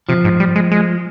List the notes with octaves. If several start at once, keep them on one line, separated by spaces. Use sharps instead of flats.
C3 F3
G#2
G3
G#3
G#3